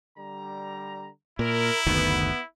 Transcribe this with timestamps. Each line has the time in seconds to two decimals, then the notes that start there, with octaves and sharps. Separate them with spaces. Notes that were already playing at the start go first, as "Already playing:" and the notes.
0.17 D3 G3 A#5
1.39 A#2 E4 A#4
1.87 F#1 D2 D#3 B3